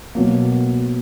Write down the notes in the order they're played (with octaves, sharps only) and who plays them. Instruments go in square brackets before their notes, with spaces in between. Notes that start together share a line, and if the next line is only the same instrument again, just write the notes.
[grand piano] B2 F#3 A#3